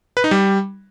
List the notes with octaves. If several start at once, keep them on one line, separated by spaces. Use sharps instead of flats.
B4
D#4
G3